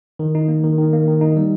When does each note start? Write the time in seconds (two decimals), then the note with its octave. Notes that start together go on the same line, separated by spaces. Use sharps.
0.19 D#3
0.35 D#4
0.48 A#3
0.64 D#3
0.78 D#3
0.93 A#3
1.07 D#3
1.21 D#4
1.37 G3